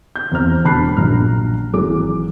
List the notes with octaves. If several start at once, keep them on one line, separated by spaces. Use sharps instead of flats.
G6
E2 C4 C5 A#5 F6
E1 D4 A5 B5 F#6 C7
A#1 F#3 A#5 F6
G#1 E3 F#3 G#4 D6